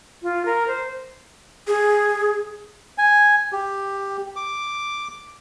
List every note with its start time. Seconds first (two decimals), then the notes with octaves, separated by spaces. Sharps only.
0.23 F4
0.45 A#4
0.68 C5
1.67 G#4
2.98 G#5
3.52 G4
4.36 D6